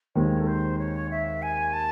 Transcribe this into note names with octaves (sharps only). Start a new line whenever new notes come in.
D#2 D#3 G#3 C4 C#5
A4
C5
C#5
E5
G#5
A5